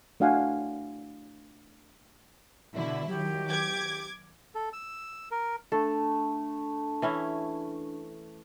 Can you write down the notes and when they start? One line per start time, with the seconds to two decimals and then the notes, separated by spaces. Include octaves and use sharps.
0.20 A3 D4 F#4 F5 F#5 G#5
2.74 B2 D3 E4
3.08 D#3 F#3 G4
3.49 D6 G#6
4.55 A4
4.73 E6
5.31 A#4
5.72 A3 D4 A4
7.02 E3 C#4 E4